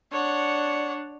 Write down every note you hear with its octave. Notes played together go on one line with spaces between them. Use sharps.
D4 C#5 F#5